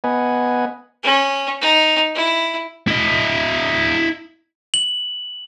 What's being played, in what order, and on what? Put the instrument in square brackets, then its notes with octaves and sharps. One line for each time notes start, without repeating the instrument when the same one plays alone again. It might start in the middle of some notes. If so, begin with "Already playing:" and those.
[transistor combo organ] B3 B4 D#5 F#5 G#5
[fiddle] C#4
D#4
E4
[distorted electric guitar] E4 D#5
[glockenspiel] F#7